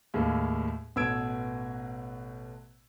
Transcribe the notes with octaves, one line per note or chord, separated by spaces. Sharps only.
D#2 A2 G#3 A#3
A1 B2 E6 G#6 D7